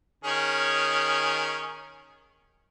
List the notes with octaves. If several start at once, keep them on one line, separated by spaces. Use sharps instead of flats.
D#3 C#4 G#4